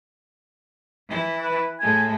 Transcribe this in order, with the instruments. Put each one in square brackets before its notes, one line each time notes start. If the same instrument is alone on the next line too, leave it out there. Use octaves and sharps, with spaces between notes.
[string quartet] E3 E4
[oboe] B4
[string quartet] A2 G#3 A3 [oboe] G#5